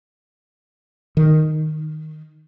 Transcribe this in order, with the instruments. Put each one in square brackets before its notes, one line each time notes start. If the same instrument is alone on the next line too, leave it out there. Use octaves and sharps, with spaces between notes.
[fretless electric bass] D#3